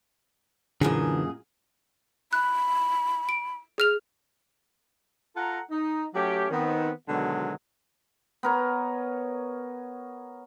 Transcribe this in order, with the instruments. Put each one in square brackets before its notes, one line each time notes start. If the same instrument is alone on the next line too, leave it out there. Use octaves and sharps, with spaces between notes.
[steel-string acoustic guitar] F#2 A#2 G#4 [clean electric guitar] D3 E3
[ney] B5 [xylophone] F#6
[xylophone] D7
G#4 F6 F7
[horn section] F4 A4 F#5 A#5
D#4
F#3 A3 C#4 G4
D#3 B3 C4
B2 D3 D#3 F#3 G#3
[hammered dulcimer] B3 A#4 C#5